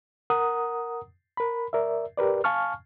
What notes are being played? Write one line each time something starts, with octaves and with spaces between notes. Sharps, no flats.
A#4 F#5 A#5 D#6
A#4 B5
A#4 D5 E5
G4 A#4 B4 D5
F5 G#5 A5 C#6 F6